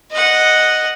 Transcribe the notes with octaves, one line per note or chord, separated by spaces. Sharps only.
D#5 F#5